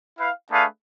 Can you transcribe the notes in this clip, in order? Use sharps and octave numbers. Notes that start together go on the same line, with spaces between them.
E4 B4 F5
A3 D4 G#4 B4 F5